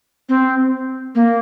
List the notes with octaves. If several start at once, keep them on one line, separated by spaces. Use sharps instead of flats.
C4
A#3